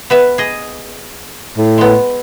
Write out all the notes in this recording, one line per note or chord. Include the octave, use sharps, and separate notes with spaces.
B3 B4 E5
G#4 D#5
A2
G#3 B3